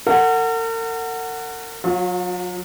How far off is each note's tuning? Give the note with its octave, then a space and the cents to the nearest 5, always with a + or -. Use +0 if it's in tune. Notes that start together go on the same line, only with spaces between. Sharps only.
A#4 -45 F#5 +0
F#3 -25 F4 +40